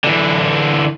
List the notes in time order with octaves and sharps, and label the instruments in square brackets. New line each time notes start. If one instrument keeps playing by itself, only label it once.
[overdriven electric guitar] D3 E3